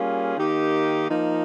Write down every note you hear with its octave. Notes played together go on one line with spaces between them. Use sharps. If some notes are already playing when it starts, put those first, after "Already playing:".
Already playing: G3 A#3 C#4 F4 G#4
D#3 A#3 D#4 G4
F3 A#3 D#4